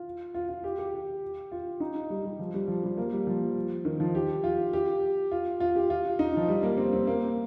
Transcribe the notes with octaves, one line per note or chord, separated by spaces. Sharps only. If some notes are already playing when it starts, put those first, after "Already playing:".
Already playing: F4
F4
F4
G4
G4
F4
D#4
G3
G3
F3
G3
F3
G3
A#3
G3
F3
D#3
F3
G4
F4
G4
F4
F4
G4
F4
D#4
F3
G3
A#3
C4
C4
A#3